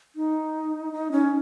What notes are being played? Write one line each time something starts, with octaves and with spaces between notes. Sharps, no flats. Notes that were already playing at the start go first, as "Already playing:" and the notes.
D#4
D#4
C#4